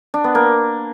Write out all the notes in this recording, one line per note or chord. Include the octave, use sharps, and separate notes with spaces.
D4
B3
A#3